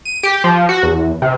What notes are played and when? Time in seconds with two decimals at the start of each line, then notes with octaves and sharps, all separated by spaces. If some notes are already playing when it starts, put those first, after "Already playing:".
0.05 D#7
0.23 G4
0.44 F3
0.69 F#4
0.83 E2
1.22 C3